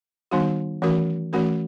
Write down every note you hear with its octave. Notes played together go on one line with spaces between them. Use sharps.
D#3 G3 B3 D#4 F#4
E3 A3 C#4 F#4 A#4
E3 A3 C#4 F#4 A#4